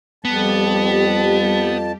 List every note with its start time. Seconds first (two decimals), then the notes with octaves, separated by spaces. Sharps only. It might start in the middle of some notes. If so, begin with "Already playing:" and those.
0.25 F2 G3 B3 G4 A5